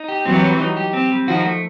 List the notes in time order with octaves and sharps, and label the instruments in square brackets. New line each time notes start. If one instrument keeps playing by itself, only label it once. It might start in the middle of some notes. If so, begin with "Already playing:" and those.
Already playing: [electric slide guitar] D#4
G4
[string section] E3 F#3 [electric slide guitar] C4
[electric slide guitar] G3
D#4
G4
C4
G3
[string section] D#3 F3 [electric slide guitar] F#4
[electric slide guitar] A3